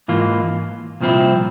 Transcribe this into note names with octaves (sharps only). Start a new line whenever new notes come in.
G#2 E3 A#3 F4
C2 A#2 F3 C4 E4